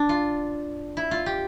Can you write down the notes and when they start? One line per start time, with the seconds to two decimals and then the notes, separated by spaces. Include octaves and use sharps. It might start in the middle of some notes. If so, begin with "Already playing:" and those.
Already playing: D4
0.09 F4
0.97 E4
1.11 F4
1.26 G4